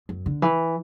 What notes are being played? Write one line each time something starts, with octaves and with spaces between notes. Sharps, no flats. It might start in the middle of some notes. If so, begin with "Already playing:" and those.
F#2
D3
E3